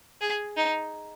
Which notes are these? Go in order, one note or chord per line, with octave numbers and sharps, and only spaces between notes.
G#4
D#4